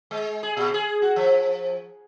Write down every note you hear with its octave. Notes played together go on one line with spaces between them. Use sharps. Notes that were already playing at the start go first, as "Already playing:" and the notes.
G#3
G#4
A#2
G#4
F#4
F3